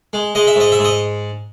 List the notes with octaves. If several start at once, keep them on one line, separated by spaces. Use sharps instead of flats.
G#3
G#3 D#5
E5
G#2 D#5
E5
G#2
D#5